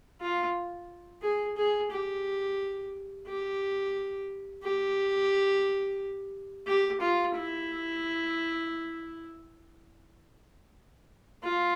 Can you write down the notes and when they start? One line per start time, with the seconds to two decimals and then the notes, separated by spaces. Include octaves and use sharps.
0.21 F4
1.22 G#4
1.57 G#4
1.91 G4
3.27 G4
4.63 G4
6.67 G4
7.01 F4
7.36 E4
11.44 F4